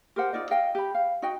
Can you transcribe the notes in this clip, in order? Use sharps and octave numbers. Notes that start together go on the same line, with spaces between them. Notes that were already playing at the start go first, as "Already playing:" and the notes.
G4 A#4 C5 F#5
D#4 F4 D5 D#5
D#5 F5 G5
G4 B5
F5
D#4 F#4 D#5 G5